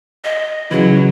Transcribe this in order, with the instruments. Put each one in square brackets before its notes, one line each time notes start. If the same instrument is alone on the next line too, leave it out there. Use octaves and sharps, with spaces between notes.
[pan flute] D#5
[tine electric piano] C#3 E3 [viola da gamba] F#3 [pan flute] E4